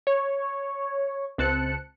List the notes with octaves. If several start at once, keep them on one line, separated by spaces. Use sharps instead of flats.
C#5
C#2 C4 A5 F#6 C#7